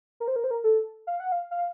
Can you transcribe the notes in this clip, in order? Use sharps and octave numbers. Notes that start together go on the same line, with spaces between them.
A#4
C5
A#4
C5
A#4
A4
F5
F#5
F5
F5